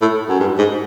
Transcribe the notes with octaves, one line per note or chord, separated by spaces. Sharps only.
A2
F#2
G2
G#2